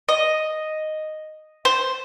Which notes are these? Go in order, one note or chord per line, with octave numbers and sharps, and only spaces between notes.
D#5
C5